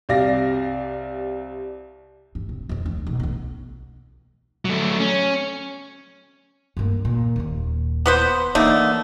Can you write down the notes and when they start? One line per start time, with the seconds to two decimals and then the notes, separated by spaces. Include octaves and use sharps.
0.09 C2 C3 D5 F5 A#6
2.35 G2
2.49 C3
2.69 F2 C#3
2.86 D2
3.07 B1
3.20 B1 B3
4.65 F#3 A3
5.00 C#4
6.77 G2 A#3
7.05 A#2
7.36 D#1 D#2
8.06 B3 B4 C5
8.55 D3 E3 A3 A#3 D#4